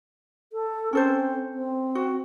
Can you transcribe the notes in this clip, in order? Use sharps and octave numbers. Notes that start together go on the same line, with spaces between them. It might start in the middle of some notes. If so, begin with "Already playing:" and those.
A4
C4 C#4 A4 C5
C4
F#4